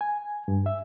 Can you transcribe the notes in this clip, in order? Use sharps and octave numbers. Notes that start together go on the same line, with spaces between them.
G#5
G2
E5